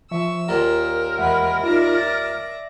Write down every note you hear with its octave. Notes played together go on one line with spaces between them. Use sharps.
F3 E5 C#6 E6
D#2 A#2 A#4 A#5
E2 G#3 E5 F#5 B5
D#4 F4 D5 E5 A#6
A6